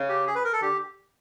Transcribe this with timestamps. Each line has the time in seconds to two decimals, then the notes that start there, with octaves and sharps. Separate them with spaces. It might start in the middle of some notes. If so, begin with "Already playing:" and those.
Already playing: C#3
0.09 G4
0.27 G#4
0.35 B4
0.44 A#4
0.53 A4
0.62 D3 G4